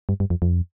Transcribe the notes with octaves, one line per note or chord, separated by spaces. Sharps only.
G2
G2
F2
F2